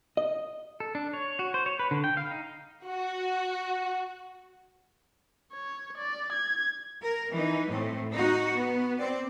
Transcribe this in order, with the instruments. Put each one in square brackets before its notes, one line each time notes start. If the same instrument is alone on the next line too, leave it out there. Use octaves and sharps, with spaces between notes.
[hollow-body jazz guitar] D#5
[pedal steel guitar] A4
D4
C#5
F#4
C5
C#5
B4
D3
G5
F5
D#4
[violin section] F#4
[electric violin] C#5
D5
G#6
[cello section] A#4
E3 D#4
A2 A3 C4
D#4 F#4
B3
C4 D5